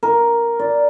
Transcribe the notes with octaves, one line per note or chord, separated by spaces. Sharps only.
A#4
D5